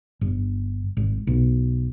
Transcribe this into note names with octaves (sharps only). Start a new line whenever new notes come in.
G1
G#1
B1